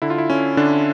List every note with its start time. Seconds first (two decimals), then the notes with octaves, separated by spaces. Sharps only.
0.02 D3 E4
0.10 F4
0.18 E4
0.30 D3 C#4
0.57 D3 D4